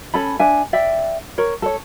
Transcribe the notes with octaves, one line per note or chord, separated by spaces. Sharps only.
C#4 A4 B5
D4 E5 G#5
D5 E5 G5
A#4 C#5
A4 C#5